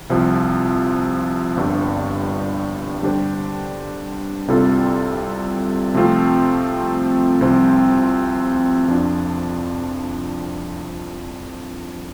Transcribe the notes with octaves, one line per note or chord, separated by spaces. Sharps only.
C2 C3 F3
G1 G2 G3 D4
D3 G3 D4 G4 C5
C2 C3 G3 F4 A4
C3 F3 A3 C4 F4
C2 C3 F3 C4
F2 F3 D4